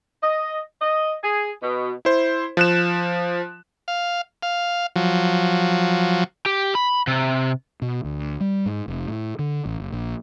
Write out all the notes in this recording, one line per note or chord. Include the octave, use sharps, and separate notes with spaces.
D#5
D#5
G#4
B2
E4 C5
F3 F#6 E7
F5
F5
F3 F#3
G4
B5
C3
B2
D2
G3
G#2
F1
A2
D3
A1
F#1
A#1